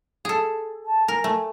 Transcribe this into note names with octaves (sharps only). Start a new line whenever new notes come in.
G#4 A4
A5
A#4 G#5
A3